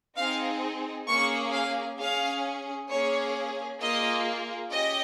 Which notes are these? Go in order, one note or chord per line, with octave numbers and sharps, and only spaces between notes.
C4 D#4 G#4 F5
A#3 C#4 G#4 C#6
F5
C#4 G#4 F5
A#3 C#4 G#4 C#5
A#3 F4 G#4 D#5
C#4 G4 D#5